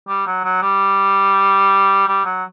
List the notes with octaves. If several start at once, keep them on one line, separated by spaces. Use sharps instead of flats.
G3
F#3
F#3
G3
G3
F#3